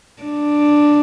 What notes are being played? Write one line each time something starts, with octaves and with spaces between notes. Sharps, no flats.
D4